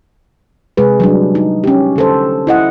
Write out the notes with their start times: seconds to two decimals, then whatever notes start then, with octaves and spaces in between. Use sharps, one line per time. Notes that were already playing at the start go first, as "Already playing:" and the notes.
0.77 C3 G#3 G#4 B4
1.00 F#3 G3 D4
1.35 D#4
1.64 C#4 G4
1.96 D3 A4 C5
2.47 E4 D#5 F#5